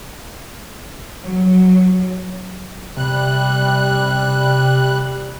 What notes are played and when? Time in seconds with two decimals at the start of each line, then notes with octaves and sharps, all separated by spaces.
1.23 F#3
2.97 C3 G3 F#6